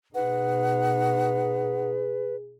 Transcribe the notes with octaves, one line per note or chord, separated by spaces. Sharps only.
B2 D#4 G#4 B4 F#5